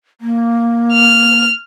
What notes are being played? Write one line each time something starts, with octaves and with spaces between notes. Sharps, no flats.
A#3
F6